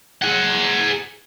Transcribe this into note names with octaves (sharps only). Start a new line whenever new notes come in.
G#4 F#5